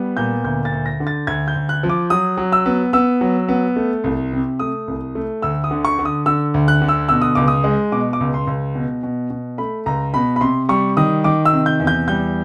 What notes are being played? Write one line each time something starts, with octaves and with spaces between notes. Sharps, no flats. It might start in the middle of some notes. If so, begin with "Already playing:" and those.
Already playing: G3 B3
A#2 G6
D2 G6
A6
D2
A#6
D3
A6
D2 G#6
G6
D2
F#6
F3
D6
F#3 D#6
F#3
E6
B3
B3 E6
F#3
B3
A3
C2
C3
A3 D#6
C2
A3
D2 E6
D#6
D3
C#6
D3
D#6
D3 E6
D2
F#6
D3
E6
B2 E6
D#6
C#2 D6
D#6
G#3
B2 D6
D6
C#2
C6
C#2
B2
B2
B2
A3 B5
C#2 A#5
B2 B5
B5
C3 C6
G3 C#6
D#3 D#6
D#3 D6
E6
C3
G6
E2
G6
G3 G6